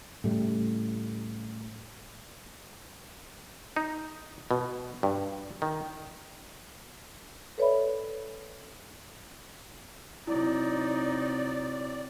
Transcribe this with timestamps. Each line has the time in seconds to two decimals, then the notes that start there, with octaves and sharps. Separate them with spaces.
0.24 A2 C#3 G3 A3
3.76 D#4
4.51 B2
5.03 G2
5.62 D#3
7.58 A4 B4 C#5 D5 E5 B5
10.27 C3 F#3 D#4 E4 D5